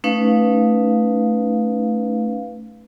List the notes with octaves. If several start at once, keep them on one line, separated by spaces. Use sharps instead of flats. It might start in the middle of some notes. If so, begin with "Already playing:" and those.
A3 C#4 D#4 B4 F5